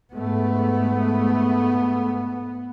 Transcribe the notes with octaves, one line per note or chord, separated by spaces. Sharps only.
G#2 A3 B3